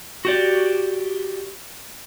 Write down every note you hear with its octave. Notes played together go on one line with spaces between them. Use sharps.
F#4 G4 D5